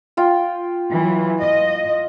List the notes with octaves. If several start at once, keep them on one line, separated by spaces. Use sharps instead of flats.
F4 G5
E3 F#3
D#5